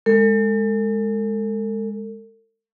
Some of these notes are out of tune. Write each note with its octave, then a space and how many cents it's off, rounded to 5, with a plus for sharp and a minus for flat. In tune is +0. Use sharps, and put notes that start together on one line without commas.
G#3 +0 A4 +40